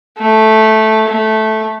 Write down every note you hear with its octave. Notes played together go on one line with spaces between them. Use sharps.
A3
A3